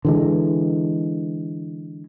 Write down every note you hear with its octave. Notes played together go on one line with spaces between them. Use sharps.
D3 E3 G#3